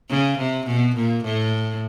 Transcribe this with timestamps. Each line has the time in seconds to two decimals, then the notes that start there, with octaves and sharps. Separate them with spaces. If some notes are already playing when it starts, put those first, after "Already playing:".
0.09 C#3
0.39 C3
0.66 B2
0.96 A#2
1.24 A2